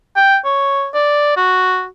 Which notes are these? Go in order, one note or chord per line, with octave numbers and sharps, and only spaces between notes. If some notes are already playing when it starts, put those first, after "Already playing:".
G5
C#5
D5
F#4